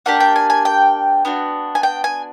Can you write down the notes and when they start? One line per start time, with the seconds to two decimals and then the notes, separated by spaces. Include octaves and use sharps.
0.06 A#3 D4 G4 F#5
0.20 G5
0.36 G#5
0.50 G#5
0.65 G5
1.25 B3 D4 F#4
1.75 G#5
1.83 G5
2.04 G#5